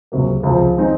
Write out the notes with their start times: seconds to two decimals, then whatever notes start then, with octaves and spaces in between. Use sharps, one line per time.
0.12 C#2 C3 F#3 A#3
0.43 C#2 C3 F3 C4
0.77 D#3 G#3 C4 D#4